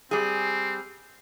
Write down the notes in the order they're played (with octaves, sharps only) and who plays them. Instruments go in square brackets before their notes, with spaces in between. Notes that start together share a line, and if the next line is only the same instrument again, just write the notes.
[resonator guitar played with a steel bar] G3 G#4 [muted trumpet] C4